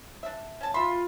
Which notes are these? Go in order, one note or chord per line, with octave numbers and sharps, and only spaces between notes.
D4 E5
C#4 A5
F4 E5 B5 C6